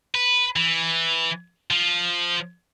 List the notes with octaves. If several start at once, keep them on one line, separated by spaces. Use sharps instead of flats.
B4
E3
F3